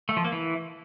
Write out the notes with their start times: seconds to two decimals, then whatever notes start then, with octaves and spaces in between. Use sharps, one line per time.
0.09 A3
0.17 F3
0.24 A#3
0.32 E3